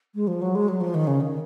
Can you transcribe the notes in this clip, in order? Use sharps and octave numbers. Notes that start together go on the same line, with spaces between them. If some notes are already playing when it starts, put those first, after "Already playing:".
G#3
F3
F#3
G#3
F#3
F3
D#3
C#3
D#3